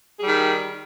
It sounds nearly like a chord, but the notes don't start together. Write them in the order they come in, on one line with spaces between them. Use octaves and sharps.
G#4 G3 D#3